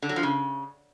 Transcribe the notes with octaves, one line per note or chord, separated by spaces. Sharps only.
D3
F#3
F3
C#3